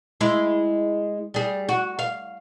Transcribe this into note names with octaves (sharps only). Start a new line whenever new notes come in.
G#3 E4
G3 G#4
F#4
F5